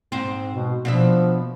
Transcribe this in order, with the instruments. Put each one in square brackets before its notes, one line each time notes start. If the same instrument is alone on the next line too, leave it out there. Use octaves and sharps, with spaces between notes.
[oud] G#2 C4
[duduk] B2
[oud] B2 D4 E5 [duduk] F3